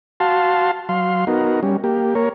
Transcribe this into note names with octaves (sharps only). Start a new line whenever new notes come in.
F#4 F5 A5 C6
F#3 F5 C6
B3 D#4 F#4 A#4
G3 C#4
A#3 G4
A#3 A#4 C#5